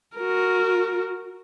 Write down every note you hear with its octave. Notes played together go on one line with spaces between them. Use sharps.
F#4 A#4